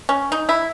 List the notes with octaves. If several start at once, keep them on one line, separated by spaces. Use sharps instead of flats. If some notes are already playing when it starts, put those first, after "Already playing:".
C#4
D#4
E4